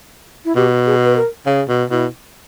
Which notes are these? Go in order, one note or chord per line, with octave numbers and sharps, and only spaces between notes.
E4
B2 G4
G#4
B4
A#4
C#3 G#4
B2
B2 E4